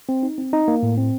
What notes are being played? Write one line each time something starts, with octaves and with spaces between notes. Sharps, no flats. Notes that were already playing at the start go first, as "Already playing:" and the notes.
C4
D#4
C4
D#4
A#3
A2
C4